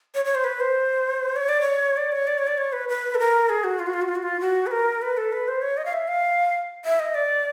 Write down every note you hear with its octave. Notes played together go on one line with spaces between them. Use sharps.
C#5
C#5
C5
B4
C5
C#5
D5
C#5
D5
C#5
D5
C#5
D5
C#5
B4
B4
A4
A#4
G#4
F#4
F4
F#4
F4
F#4
F4
F#4
F4
F#4
B4
A#4
B4
A4
B4
C5
C#5
D#5
F5
E5
F5
E5
D#5
D5